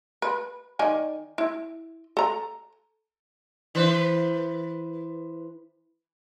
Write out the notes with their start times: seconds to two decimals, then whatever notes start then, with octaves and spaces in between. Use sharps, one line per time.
0.22 B4
0.79 D#3 D5 G#5
1.38 E4
2.17 A4 A#5
3.75 E3 B4 C5